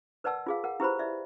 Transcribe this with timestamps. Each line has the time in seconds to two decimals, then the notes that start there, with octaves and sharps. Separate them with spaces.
0.24 A#4 B4 D5 F#5 A5 E6
0.47 F4 G#4 F5
0.64 A#4 F#5
0.80 E4 G4 B4 C5 B5
0.99 D5 E5